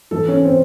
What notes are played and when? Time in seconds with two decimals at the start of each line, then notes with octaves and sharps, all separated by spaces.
0.11 E3 A4
0.28 C#4
0.45 C4